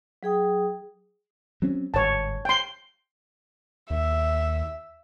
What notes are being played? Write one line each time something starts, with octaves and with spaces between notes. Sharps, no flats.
F#3 G#4 G5 D#6
F#3 C4 C#4
G1 G#2 C#5 A5
G5 C6
D#2 E5